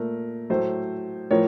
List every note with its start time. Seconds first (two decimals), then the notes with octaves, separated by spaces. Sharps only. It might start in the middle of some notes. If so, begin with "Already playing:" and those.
Already playing: A#2 A3 A#4
0.50 A2 F#3 A3 C5
1.31 A2 F3 A#4 C#5